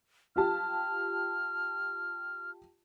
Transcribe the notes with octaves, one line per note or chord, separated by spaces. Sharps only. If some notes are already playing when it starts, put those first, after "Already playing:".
F4 G4 A5 F6